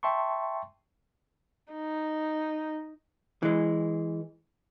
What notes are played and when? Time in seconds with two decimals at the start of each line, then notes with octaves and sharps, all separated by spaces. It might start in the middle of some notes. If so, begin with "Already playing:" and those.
0.03 E5 G5 A5 C6 C#6
1.73 D#4
3.43 E3 G#3